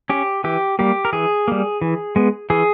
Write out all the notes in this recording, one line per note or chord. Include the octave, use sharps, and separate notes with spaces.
C#4 G4
E3 G4
G3 A#3 G4
A#4
E3 G#4
G3 A#3
E3
G#3 B3
E3 G#4